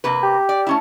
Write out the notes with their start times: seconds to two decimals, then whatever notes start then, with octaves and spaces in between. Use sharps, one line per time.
0.04 C3 A#3 B4
0.23 G4
0.49 D5
0.67 A3 C#4 E4